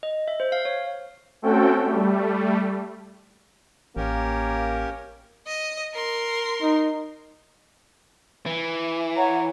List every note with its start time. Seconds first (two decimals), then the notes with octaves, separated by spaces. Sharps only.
0.03 D#5
0.28 E5
0.40 C5
0.52 F5
0.65 C#5
1.42 A3 C4 C#4 F#4 A4 G5
1.85 G3 A3
3.97 A1 A#3 C#4 G4 A#4
5.47 D#5
5.94 A#4 C6
6.62 D#4
8.46 E3
9.17 C#5 F#5 A#5